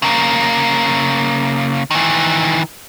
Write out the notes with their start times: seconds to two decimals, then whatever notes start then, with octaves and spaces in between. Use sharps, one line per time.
0.02 C#3 A#3
1.91 D#3 E3